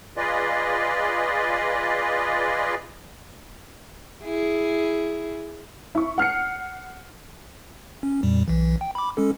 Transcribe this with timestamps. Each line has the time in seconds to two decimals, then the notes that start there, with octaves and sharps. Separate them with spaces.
0.17 F4 G#4 B4 D5 D#5
4.24 E4 G#4
5.95 E4 C#6
6.18 F#5 F6 C7 C#7
8.03 C#4
8.23 F2 A#2 G3
8.48 B1 E3
8.81 G5
8.95 B5 D6
9.17 G#3 C#4 A4